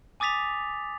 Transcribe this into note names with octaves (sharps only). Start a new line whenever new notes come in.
G#5 D6 D#6 A6 B6 F7